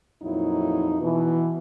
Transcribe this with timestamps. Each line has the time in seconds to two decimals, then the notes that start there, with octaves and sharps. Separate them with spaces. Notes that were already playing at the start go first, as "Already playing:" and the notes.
0.23 F2 A#2 F#3 D#4 E4
1.01 B2 E3